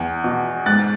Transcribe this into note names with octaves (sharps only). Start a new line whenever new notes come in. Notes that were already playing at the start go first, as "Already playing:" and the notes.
Already playing: E2
B2
G#2 F#6 A6